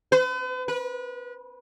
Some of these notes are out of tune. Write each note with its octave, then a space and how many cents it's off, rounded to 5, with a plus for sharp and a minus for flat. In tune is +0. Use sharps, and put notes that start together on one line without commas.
B4 +45
B4 -30